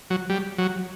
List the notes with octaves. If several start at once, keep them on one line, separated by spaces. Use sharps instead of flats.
F#3
G3
F#3